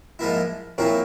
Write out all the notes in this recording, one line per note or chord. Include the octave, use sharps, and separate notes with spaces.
G#2 F3 A#3 E4
A#2 F3 C4 E4 A#4 C#5